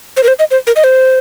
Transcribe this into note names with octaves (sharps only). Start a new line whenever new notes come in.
C5
A#4
C5
D#5
C5
A#4
D#5
C5